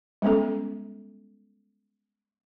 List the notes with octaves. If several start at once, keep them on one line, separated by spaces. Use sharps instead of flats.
G3 G#3 B3 C#4 A4